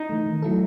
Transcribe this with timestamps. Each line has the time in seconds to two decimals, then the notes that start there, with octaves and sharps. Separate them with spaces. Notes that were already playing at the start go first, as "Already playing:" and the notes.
Already playing: D#4
0.10 E3 A3
0.26 D#3
0.42 F#3 A3 E4 A4